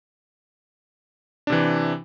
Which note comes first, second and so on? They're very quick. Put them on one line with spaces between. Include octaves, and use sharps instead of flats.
D4 C3 E3